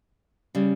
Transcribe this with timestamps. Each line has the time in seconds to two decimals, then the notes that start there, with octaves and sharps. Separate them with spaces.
0.55 C#3 G3